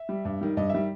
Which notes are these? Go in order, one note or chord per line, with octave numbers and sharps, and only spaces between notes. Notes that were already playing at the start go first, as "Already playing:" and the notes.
Already playing: E5
G3
G2
D#3 G3
G2 D#5
D#3 G3 E5